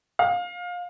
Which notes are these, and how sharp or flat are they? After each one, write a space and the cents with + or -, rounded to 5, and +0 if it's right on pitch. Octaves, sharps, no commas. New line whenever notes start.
F5 +25